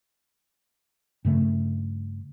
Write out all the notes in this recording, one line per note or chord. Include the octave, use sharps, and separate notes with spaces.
G2 C#3 A3